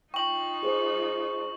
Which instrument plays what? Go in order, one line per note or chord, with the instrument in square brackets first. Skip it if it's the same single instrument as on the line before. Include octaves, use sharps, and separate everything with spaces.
[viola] D#4 F4 [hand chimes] G5 [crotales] C#6 F#7
[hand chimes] G#4 C5